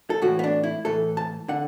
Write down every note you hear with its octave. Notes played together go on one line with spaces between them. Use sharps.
A4
A2 E3 F#4
B3
D4
E4
A2 E3 A4
A5
D3 F#5